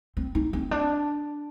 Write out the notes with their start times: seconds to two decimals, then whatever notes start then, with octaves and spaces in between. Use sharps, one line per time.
0.17 C4
0.35 D#4
0.53 C4
0.71 D4